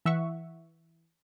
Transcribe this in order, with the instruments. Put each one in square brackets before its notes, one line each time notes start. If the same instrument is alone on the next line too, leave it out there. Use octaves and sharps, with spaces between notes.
[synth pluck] E3 E5 F#5 C#6